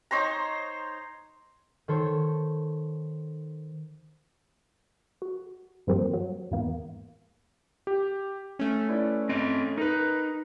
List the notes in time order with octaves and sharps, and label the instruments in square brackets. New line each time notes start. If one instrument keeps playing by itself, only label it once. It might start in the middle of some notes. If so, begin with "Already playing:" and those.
[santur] D#4 C5 C#5 A#5
[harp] D#3 A4 C5 C#5
[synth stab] F#4
G2 D#3 F3 G3 A#3 C4
F#3
E2 G#2 A#3 B3
[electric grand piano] G4
[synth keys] A3 C#4
[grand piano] E4 B4 D5
[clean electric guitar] C4 D#5 [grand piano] D7
[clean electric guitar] D#4 [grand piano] A#4 B4